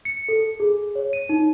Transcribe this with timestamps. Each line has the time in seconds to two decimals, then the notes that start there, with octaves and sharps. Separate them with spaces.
0.05 C#7
0.29 A4
0.60 G#4
0.95 C#5
1.13 D#7
1.29 D#4